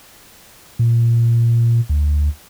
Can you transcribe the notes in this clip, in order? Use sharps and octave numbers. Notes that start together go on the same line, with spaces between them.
A#2
D2